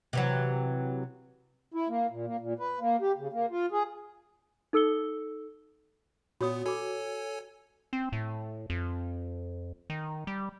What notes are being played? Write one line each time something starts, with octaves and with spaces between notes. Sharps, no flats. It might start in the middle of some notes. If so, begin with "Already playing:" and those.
C3 E3 F#3
E4
A#3
A#2
A#3
A#2
B4
A#3
G4
C#3
A#3
F4
G#4
D#4 A4 E6 C#7 G7
A#2 B3 F#4 C#5 D#6
F#4 A4 C#5 G#5 D6
C4
A2
F2
D#3
G3